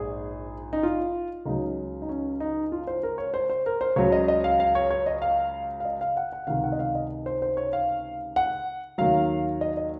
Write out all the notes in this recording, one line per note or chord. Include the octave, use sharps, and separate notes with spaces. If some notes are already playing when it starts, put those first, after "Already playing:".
Already playing: A#1 G#2 G#4
D#4
F4
C#2 C#3 F#3 D#4
D#4
C#4
D#4
F4
C5
A#4
C#5
C5
C5
A#4
C5
C#2 C#3 F#3 C#5
D#5
D#5
F5
F5
C#5
C#5
D#5
F5
F5
D#5
F5
F#5
F#5
C#2 C3 D#3 F5
F#5
D#5
F5
D#5
C5
C5
C#5
F5
F#5
D#2 D#3 F#3 F5
D#5
D#5